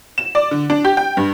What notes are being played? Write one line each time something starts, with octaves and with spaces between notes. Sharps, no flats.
E7
D5
D3
D4
G4
G5
G2